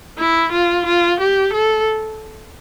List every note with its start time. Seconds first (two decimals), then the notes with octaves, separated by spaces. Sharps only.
0.18 E4
0.52 F4
0.86 F4
1.20 G4
1.53 A4